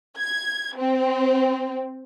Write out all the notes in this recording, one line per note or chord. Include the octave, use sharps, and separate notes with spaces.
G#6
C4